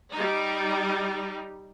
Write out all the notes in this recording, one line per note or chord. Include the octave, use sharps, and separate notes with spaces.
G3 D#4